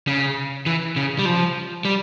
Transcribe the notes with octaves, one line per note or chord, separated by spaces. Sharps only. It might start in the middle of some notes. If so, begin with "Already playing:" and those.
C#3
E3
C#3
G3
F3
G3